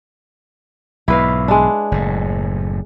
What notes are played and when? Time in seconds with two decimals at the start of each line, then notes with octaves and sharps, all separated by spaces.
1.08 B1 G#2 E4 B4 F5
1.48 G#3 D4
1.92 F#1 A2